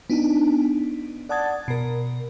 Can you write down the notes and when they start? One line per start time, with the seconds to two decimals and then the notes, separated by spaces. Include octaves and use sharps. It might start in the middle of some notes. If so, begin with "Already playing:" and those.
0.10 B3 D4 D#4
1.29 D5 F#5 A5 D#6 G#6 A6
1.68 B2 A#4